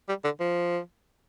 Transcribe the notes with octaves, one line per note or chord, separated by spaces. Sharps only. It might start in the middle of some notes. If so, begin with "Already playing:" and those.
G3
D3
F3